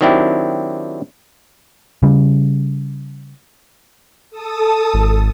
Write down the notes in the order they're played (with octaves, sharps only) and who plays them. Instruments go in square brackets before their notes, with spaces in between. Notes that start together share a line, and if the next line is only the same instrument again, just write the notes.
[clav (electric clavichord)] D#3 F#3 C4 D4 E4 G4
[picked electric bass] C#3 G3
[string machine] A4 A5 D#6
[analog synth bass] G#1